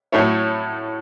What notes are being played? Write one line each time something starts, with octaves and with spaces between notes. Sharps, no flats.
A2 F#3 A3 E4 C#5